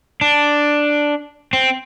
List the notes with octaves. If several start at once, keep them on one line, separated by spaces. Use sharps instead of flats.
D4
C4